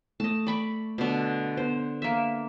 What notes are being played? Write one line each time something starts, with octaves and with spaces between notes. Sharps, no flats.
A3 D#5 A5
D5 B5 C#6
B2 D3
B3 C5
A#3 E5